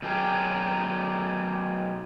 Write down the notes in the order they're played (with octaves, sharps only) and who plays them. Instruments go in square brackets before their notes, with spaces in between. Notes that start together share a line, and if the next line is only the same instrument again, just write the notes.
[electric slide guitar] B2 F#3 G4 G#4 A#4